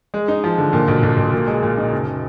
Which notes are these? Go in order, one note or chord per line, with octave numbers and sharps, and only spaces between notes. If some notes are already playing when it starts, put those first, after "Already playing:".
G#3
D#4
F3
D3
A#2
B1
B1
B1
A#2
G#3
A#2
D#4
F#1